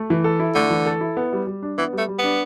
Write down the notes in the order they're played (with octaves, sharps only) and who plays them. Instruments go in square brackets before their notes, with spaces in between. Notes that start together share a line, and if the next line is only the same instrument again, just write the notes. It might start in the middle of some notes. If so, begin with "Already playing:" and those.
Already playing: [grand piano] A3
E3
A4
E4
[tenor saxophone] D3 [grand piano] A3
[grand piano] E3
A4
E4
B3
G3
G3
D4
[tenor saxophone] E3 [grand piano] B3
[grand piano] G3
[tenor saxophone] A3
[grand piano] G3
[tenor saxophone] B3 [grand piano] D4